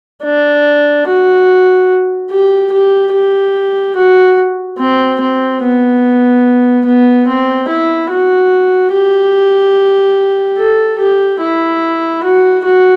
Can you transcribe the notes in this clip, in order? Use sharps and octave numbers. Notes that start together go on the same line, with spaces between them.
D4
F#4
G4
G4
G4
F#4
C4
C4
B3
B3
C4
E4
F#4
G4
A4
G4
E4
F#4
F#4